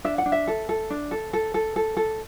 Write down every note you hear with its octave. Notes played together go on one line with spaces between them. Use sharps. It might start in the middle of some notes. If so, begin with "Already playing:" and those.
D4 E5
F#5
D4
E5
A4
A4
D4
A4
A4
A4
A4
A4